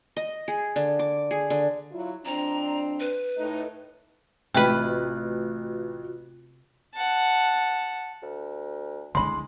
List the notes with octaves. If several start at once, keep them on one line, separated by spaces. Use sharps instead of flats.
D#5
G#4
D3
D6
G#4
D3
F#3 E4 F4
F2 C4 D4 A#5
B4
A2 A3 D#4
A1 C3 F4 F#4 B4
F#5 A5
D2
D3 G#3 E4 B5 C6